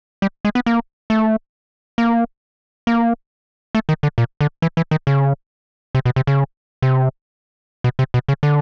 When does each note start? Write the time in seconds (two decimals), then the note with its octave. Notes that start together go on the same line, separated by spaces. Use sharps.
0.22 G3
0.45 G#3
0.55 B3
0.66 A#3
1.10 A3
1.98 A#3
2.87 A#3
3.75 A3
3.89 D#3
4.03 D3
4.18 A#2
4.41 D3
4.62 E3
4.77 E3
4.91 D#3
5.07 C#3
5.95 C3
6.05 B2
6.16 C3
6.27 C#3
6.82 C3
7.84 B2
7.99 C3
8.14 B2
8.28 C#3
8.43 D3